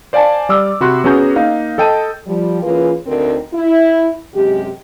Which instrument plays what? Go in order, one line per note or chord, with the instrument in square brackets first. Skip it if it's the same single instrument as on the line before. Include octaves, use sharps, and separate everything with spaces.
[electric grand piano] C5 D5 F5 G#5 A5
G3 D5 D6 E6 F6
C3 F#4 B5 C6 F#6
B3 C#4 F#4 G#4 A#5 G6
A#3 D#4 F5
A4 D#5 G5 A5 D#7
[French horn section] F3 G3
E3 A#3 C#4 F4 G#4 B4
D2 C4 D#4 A#4
E4
F#2 C3 G#3 G4